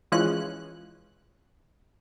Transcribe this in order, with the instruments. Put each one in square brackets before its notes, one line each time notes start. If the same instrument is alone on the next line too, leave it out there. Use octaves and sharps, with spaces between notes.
[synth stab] E3 F3 G#3 C#4 F#6